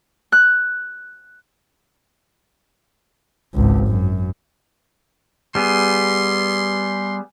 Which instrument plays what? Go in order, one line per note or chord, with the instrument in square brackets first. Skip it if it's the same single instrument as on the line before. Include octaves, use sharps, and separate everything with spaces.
[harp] F#6
[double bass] G#1 C#2
F#2
[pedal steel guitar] G3 B3 G#4 [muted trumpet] C6